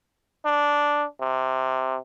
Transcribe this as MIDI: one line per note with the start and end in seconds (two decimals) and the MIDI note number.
0.46 1.05 62
1.21 1.97 48